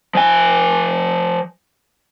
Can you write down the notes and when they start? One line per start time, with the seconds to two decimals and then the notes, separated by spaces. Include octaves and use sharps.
0.15 F3 G#5